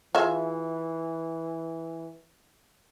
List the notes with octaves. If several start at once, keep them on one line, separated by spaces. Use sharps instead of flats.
E3 F4 G#4 E5